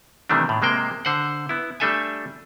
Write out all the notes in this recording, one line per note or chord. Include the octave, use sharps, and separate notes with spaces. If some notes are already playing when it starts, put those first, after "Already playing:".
C3 D#3 E3 G3 A3 D4
A2
C3 G#3 A#3 C5 G5
D3 C5 F#5
B3 E4
G3 A3 D4 A4 E5 G#5